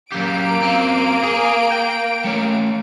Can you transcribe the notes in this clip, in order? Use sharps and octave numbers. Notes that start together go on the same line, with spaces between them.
F#2 A#3 G4 D7
F#2 C4
G#4
G5
A3 C#4